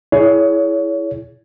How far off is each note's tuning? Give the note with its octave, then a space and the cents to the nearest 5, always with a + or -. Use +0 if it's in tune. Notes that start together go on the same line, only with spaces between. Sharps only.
E4 +0 G#4 +20 C#5 +30